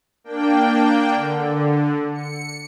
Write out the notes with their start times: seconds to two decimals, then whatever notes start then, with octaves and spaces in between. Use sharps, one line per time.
0.24 A#3 D4 G5
1.15 D3
2.13 C#7